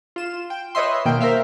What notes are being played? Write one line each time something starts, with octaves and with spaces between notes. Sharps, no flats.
F4 E7
G5
B4 C#5 D#5 E5 C6
B2 D#3 A#3 G5
A#4 C5 E5 F5